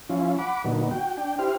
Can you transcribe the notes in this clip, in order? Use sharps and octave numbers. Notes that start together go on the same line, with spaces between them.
F3 C#4 E4 F4
F#5 B5 D6
A#2 D3 F#3 B3 D#4
F#4 G5
D4 G5
E4 G4 C5 F6